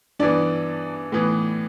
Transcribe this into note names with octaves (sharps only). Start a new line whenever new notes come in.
G2 E3 B3 D4 D5
A2 E3 B3